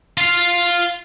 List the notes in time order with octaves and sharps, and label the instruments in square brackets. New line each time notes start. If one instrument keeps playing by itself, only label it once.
[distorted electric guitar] F4 F5